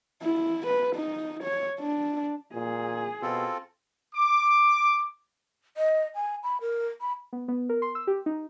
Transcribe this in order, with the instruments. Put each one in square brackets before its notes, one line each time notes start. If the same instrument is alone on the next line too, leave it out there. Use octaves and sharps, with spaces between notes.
[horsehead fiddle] E4
B4
D#4
C#5
D4
[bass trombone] A#2 [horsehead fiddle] G#4
[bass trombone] B2 [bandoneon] C4 F4 A4
[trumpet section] D6
[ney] D#5
G#5
B5
A#4
B5
[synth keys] B3
B3
A#4
C6
E6
G4
D#4